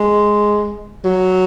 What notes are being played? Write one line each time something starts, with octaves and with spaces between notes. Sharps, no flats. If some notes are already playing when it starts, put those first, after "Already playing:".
Already playing: G#3
F#3